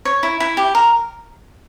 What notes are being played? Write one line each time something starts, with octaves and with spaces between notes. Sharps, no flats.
C#5
E4
E4
G4
A#4